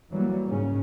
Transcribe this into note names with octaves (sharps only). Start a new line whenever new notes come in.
E3 F#3 G3 A#3
G#2 C#3 C#4